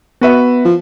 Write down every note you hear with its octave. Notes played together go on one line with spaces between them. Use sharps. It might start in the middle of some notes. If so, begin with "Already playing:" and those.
B3 F#4 B4 E5
F3